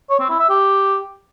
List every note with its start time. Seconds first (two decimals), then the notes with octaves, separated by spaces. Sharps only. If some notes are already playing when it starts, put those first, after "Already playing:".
0.10 C#5
0.20 C4
0.29 E4
0.39 E5
0.49 G4